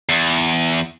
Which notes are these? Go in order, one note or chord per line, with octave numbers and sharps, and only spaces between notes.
E2